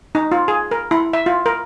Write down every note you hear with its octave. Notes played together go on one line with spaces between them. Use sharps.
D#4
F4
G#4
A#4
E4
E5
F4
A#4